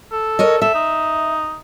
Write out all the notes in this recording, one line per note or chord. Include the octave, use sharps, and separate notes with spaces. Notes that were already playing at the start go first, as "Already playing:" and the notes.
A4
A#4 C#5 D#5
A4 E5
D#4